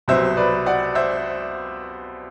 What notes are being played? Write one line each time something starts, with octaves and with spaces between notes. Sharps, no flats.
C2 B2 F#3 C5 E5
B4 D5
D5 F#5
C5 E5